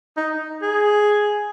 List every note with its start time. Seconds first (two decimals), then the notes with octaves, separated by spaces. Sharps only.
0.17 D#4
0.62 G#4